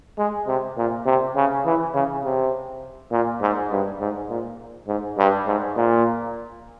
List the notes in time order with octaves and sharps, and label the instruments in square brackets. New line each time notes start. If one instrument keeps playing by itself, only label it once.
[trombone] G#3
C3
A#2
C3
C#3
E3
C#3
C3
A#2
G#2
G2
G#2
A#2
G#2
G2
G#2
A#2